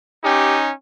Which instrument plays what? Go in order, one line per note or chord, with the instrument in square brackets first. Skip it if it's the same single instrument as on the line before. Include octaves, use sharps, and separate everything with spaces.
[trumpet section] C#4 D#4 [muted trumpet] G4